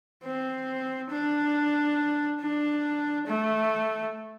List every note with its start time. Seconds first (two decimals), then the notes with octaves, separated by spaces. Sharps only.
0.24 C4
1.10 D4
2.41 D4
3.27 A3